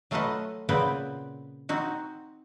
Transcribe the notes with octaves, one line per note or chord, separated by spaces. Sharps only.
F#3 A3 F4 A4 B4 D#5
A#2 C#3 B3 C4 B4 G5
C4 D#4 F#4